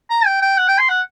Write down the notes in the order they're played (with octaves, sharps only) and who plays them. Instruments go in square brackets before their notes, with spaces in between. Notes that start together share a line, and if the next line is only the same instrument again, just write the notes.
[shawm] A#5
G5
G5
F#5
G5
C6
F#5